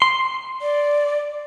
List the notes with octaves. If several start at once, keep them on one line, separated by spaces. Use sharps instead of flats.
C6
D5